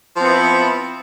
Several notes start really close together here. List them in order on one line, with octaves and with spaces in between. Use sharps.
F3 C4 B3 E4